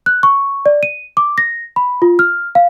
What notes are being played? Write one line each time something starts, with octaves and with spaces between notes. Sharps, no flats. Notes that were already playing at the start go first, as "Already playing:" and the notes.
F#6
C#6
D5
D#7
D6
A#6
B5
F4
F6
F5